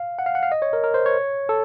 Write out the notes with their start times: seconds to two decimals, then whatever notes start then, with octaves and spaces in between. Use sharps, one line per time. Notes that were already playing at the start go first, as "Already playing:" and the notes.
Already playing: F5
0.19 F#5
0.26 F5
0.35 F#5
0.43 F5
0.52 D#5
0.62 C#5
0.73 A#4
0.84 A#4
0.94 C5
1.06 C#5
1.49 A4